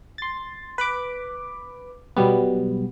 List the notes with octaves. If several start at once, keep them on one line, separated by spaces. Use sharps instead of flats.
C6 A6
B4 B5 D6
B2 F#3 G3 B3